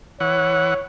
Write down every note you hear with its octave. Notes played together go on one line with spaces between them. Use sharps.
E3 C#5 F#5